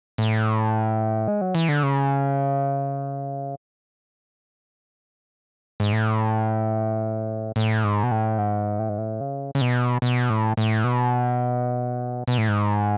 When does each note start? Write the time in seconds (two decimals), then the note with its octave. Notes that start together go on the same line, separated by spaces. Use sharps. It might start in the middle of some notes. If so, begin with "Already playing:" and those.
0.18 A2
1.28 G#3
1.41 F#3
1.55 E3
1.69 D3
1.83 C#3
5.80 G#2
5.92 A2
7.56 A2
7.84 G#2
8.03 B2
8.11 A2
8.38 G#2
8.79 A2
8.89 G#2
8.98 A2
9.21 C#3
9.55 C#3
9.61 B2
10.02 B2
10.30 A2
10.57 A2
10.84 B2
12.28 B2
12.38 A2
12.48 G#2